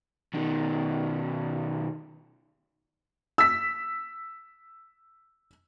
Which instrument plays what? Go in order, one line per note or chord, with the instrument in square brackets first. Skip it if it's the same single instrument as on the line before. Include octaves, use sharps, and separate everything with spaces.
[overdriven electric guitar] B2 D#3
[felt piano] E6 B6